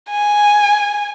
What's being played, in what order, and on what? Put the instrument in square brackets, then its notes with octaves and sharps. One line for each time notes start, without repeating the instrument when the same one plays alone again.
[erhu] G#5